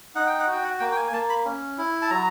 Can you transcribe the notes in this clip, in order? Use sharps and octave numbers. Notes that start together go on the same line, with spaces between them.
D#4 F#5
G5
F#5
F#4 G5
F#5
A#3 G5
G5
G#5
G#5
A#3 A5
B5
C#4
E4
A5
F#3 A#5